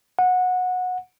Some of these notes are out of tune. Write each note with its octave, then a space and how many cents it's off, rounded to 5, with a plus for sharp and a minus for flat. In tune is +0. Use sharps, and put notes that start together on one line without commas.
F#5 -20